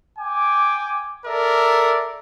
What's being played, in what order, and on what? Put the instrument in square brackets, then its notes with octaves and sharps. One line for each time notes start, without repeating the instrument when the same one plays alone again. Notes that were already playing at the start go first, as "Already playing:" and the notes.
[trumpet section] G5 G#5 D6
A4 A#4 D5 E5